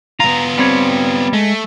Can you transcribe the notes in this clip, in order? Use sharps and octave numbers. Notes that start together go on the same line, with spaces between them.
B3 F4 A#5
G3 C4 C#5
G#3 A3